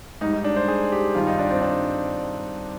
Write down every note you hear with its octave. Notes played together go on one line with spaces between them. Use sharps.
G#2 G3 D#4
D#4
D4
C5
G#4
G4
G2 D#3 G3 F4
D#4
D4
C4
D4